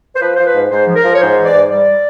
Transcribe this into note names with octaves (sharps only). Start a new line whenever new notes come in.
C5
F3 B4
F3 C5
B4
G#2
G#2 C5
F3
A#4
F3
C#5
G#2 C5
E3
D5
G#2
G3 D5